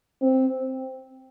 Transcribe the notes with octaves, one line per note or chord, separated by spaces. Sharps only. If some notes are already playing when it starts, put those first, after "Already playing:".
C4